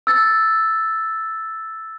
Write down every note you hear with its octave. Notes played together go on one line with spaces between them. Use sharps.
E6 A6